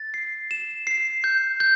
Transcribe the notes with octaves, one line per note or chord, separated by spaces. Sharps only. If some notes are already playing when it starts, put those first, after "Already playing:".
Already playing: A6
C7
E7
C7
G6
G6